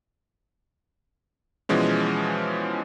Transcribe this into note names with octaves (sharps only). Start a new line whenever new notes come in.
B2 E3 F3 G#3 C#4